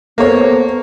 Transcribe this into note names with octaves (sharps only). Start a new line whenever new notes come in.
A#3 B3 A4 C5 C#5